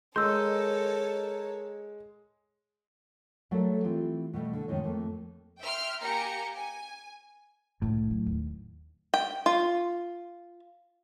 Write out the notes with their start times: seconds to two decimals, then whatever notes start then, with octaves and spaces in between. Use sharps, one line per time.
0.16 G#3 A4 A#4 C#5 D#5 C6 E6 G6
3.51 F#3 G3 A3 F#4 A4 A#4
3.84 E3 C4 F4 G4
4.34 B2 G3 A3
4.53 D3
4.68 F2 A2 D#3 G#3 C#5
4.84 F2 A3 A#3
5.60 E5 G5 C6 F6
6.01 A#3 G4 G5 G#5 A#5 C#7
6.55 G#5
7.82 C2 A2 D3
8.10 F#3
8.26 D#2
9.14 G5
9.46 F4